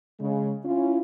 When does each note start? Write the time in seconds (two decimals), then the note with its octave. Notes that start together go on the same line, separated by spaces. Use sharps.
0.20 C#3 G#3
0.65 C#4 E4 F4